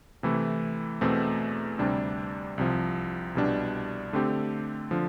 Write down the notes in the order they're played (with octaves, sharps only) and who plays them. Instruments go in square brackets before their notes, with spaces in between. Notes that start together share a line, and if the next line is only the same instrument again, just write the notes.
[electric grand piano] C3 E3 A3 E4
E2 B2 A3 C4
D2 C3 G3 D4
C2 C3 F3
C2 B2 G3 D4
D3 A3 C4 G4
D3 F3